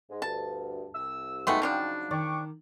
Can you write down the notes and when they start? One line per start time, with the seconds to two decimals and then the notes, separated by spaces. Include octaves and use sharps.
0.10 G#2 G#3
0.22 D2 G2 A5
0.95 C2 E6
1.47 F#3 G#3 A3 B3 D#4 F#4 G5
1.62 C#3 F3 D4
2.11 D#3 G5 C#6 D6